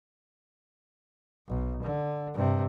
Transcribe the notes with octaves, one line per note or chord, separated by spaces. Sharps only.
B1
D3
G2 C3